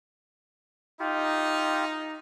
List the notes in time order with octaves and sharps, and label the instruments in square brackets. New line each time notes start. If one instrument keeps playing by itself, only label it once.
[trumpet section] D#4 [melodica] F4 G4